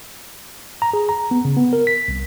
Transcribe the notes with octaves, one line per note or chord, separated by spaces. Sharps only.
A#5
G#4
A#5
B3
C#3
B3
A#4
B6
C2